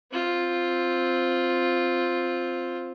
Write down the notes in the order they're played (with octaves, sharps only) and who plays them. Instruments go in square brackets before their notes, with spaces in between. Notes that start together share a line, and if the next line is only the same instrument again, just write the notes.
[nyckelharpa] C4 F4